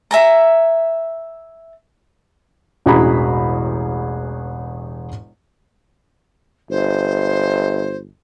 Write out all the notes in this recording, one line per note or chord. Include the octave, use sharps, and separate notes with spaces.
E5 G#5 A#5
E1 A1 F#4 G#4 A#5 B5
G1 C5